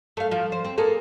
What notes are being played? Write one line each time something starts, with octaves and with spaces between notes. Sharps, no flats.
A3 F5
F3
C5
C4
A#3 G#4 A4